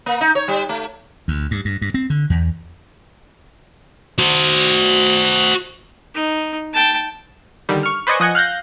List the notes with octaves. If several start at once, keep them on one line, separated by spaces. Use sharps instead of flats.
A#3
D#4
C#5
G3
A3
D2
G2
G2
G2
C4
D3
E2
F#4 C5
D#4
G5 A5
D3 D#3 G3
C#6 F6
B4 C5 D5 D#5 G#5 C#6
F3 D#5 F#5 G#5 C#7
F5 F#6 G6 A#6